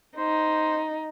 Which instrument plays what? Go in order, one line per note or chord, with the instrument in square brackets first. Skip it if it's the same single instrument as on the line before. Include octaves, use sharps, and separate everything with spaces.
[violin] D#4 [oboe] C5